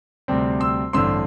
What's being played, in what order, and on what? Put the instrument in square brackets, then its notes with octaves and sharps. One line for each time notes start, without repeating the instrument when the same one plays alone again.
[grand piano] D2 C3 G3 C4
C6 E6
A1 G2 D3 C4 C6 E6